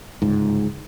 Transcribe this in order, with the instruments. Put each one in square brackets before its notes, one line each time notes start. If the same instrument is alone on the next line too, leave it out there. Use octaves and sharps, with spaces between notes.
[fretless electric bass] G1 C#2 G#2